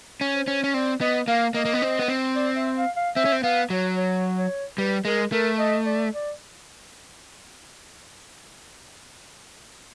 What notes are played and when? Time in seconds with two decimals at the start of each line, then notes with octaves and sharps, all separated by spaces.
0.21 C#4
0.34 C5
0.48 C#4
0.64 C#4
0.74 C4 D5
1.01 B3 D#5
1.28 A#3 F5
1.54 A#3 D#5
1.65 A#3
1.74 B3
1.82 C4
1.99 B3
2.08 C4
2.36 D5
2.56 E5
2.76 F5
2.96 F5
3.16 C4 E5
3.25 C#4
3.32 C4
3.43 B3 F5
3.70 F#3 C#5
3.97 C#5
4.37 C#5
4.78 G3 B4
5.05 G#3 A#4
5.32 A3 A#4
5.59 D#5
5.86 D5
6.13 D5